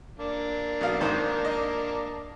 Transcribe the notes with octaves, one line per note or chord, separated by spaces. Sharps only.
A#3 D4
B1 B2 F5
G#2 D#3 C5
D#5